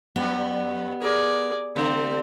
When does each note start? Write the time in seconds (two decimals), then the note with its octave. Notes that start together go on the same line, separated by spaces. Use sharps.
0.16 F2 G3 B3
1.02 G#4 A#4 D5
1.76 C#3 G3 A3 C4